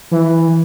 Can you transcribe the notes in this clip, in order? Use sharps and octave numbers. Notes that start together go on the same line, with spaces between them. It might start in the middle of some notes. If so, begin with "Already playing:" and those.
E3